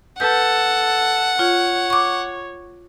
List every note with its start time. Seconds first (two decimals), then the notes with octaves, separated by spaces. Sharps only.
0.20 A4 B4 F#5 A5 G6
1.39 F4 C#5
1.90 C#6 D6